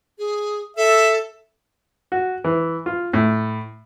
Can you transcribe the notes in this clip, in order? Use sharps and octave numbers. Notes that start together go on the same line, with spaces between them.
G#4
A4 E5
F#4
E3
F4
A2